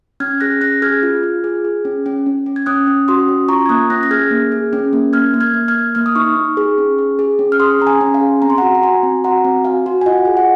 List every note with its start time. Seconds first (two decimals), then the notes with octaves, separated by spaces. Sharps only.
0.20 C#4 F6 G#6
0.40 G#4 F#6 A#6
0.61 C#4 F#6 A#6
0.82 G#4 F6 G#6
1.03 F4
1.23 F4
1.44 G#4
1.64 G#4
1.85 C#4
2.06 C#4
2.26 C#4
2.46 C#4
2.56 G#6
2.66 C#4 D#6 F#6
2.87 C#4
3.08 F#4 C6 D#6
3.28 C#4
3.48 F4 A#5 C#6
3.66 G#6
3.69 A#3 D#6 F#6
3.90 C#4 F#6 A#6
4.03 A#6
4.11 G#4 F6 G#6
4.31 A#3
4.52 G#4
4.73 C#4
4.93 A#3
5.13 A#3 F6 G#6
5.34 A#3
5.40 F6 G#6
5.54 A#3
5.68 F6 G#6
5.75 A#3
5.95 A#3 F6
6.06 D#6
6.15 D#4 C#6 F6
6.36 D#4
6.57 G#4
6.78 C#4
6.98 G#4
7.19 G#4
7.39 C#4
7.52 F6
7.60 G#4 C6 D#6
7.80 C#4 A#5
7.87 G#5 C6
8.01 C#4
8.14 F5 G#5
8.21 G#4
8.42 C4 A#5
8.50 C6
8.58 F#4 F#5 A#5
8.75 A#5
8.83 F#4 G#5 C6
9.03 C4
9.24 F#4 F#5 A#5
9.45 C4
9.65 F#4 F5 G#5
9.86 F#4
10.01 G#5
10.06 F4 D#5 F#5
10.25 G#4 G#5
10.37 F#5